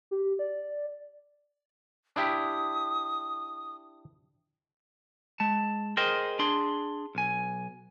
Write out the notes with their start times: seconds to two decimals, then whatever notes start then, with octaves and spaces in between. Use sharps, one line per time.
0.11 G4
0.39 D5
2.16 D4 E4 G4 D#6
5.40 G#3 A5
5.97 G#4 A#4 C5 D#5 G5
6.39 D4 G#4 C6
7.15 B1 G#5